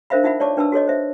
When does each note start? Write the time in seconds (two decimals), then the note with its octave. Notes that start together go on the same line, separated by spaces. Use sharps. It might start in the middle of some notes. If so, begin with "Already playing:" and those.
0.10 D4 A#4 C5 E5 F5 B5
0.24 D#4 F4 E5 F#5 B5
0.40 C#5 D5 A5 C#6 D6
0.57 D4 B4 A5 B5 E6
0.72 F#4 A4 C#5 D#5
0.88 C5 E5